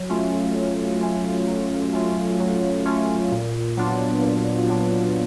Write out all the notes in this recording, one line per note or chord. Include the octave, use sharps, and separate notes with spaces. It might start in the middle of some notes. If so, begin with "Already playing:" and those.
Already playing: F#3
A3 C#4 F4
F#3
A3 C#4 F4
F#3
A3 C#4 F4
F#3
A3 C#4 F4
A#2
F#3 B3 D4 F4
A#2
F#3 B3 D4 F4